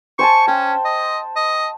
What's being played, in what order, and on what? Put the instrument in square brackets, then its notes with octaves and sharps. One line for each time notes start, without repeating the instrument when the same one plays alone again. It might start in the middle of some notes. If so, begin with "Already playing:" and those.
[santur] C5 G#5 A5 [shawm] C#6
[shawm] C#4 [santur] G5
[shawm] D#5
D#5